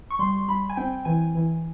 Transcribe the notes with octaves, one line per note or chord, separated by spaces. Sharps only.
C#6
G3 C6
G3 B5
G#5
C4 G5
E3 G#5
E3